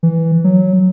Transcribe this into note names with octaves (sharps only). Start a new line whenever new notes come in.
E3
F#3